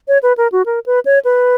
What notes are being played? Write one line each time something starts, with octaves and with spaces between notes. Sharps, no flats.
C#5
B4
A#4
F#4
A#4
B4
C#5
B4